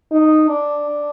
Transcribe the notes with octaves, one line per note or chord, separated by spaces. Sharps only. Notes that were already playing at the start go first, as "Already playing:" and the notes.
D#4
D4